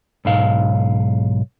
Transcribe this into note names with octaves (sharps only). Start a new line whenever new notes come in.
B1 G#2 F5